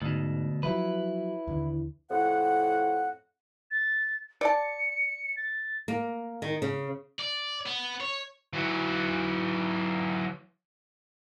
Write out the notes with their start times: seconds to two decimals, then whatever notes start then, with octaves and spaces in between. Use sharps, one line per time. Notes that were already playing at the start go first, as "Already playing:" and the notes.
0.02 D2 G#2 B2
0.63 F3 F#3 E4 B4
1.47 D#2 D3 E3
2.11 F2 A2 F#5
3.71 A6
4.41 D5 A5 C#7
5.37 A6
5.88 A#3
6.42 D#3
6.62 C#3
7.20 D5
7.66 B3
8.00 C#5
8.53 E3 F#3